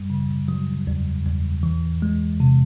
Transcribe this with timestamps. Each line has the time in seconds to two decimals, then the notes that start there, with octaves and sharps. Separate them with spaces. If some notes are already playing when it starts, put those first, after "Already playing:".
Already playing: F#2 G3
0.10 C#3
0.48 F#3
0.87 E2
1.26 E2
1.63 E3
2.02 G#3
2.40 C3